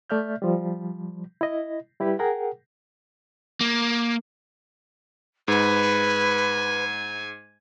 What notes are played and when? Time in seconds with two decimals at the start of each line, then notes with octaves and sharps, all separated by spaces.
0.10 A3 D5 E5 F6 G6
0.42 F3 G3
1.41 E4 D#5
2.00 G3 E4 G4 B4
2.19 G#4 A#4 F#5 G5
3.61 A#3
5.48 G#2 B4 G#5